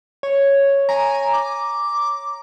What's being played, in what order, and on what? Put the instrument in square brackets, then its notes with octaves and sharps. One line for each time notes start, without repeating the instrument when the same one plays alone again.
[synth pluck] C#5
[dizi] G#5 [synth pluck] A#5
[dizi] D6